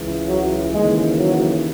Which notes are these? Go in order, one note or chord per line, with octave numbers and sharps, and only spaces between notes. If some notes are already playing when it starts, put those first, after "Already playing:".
Already playing: C#2 C#3 E3
F#3
D#2 C#3 E3 G#3
F#3